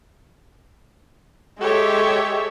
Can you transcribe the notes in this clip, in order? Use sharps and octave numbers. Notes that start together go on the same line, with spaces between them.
G#3 G4 A4 C#5 E5